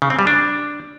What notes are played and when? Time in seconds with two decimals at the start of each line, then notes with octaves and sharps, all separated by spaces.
0.02 C#3
0.10 C4
0.19 G3
0.27 D4